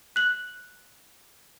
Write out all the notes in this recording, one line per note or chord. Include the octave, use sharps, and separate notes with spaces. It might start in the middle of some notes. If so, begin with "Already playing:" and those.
F#6 F#7